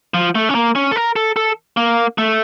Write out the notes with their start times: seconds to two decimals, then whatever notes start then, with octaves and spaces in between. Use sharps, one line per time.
0.14 F3
0.35 A3
0.49 C#4
0.55 A#3
0.75 C#4
0.91 A4
0.96 A#4
1.16 A4
1.36 A4
1.77 A#3
2.18 A3